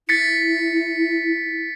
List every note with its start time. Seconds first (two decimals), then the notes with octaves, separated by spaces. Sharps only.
0.09 E4 A6 B6 C#7